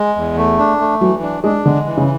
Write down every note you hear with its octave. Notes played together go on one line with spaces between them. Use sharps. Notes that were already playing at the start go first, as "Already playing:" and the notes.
Already playing: G#3
E2
A3
D4
A3
E3 F#3
D4
G#3 D4
D3 G#3
E3
C#3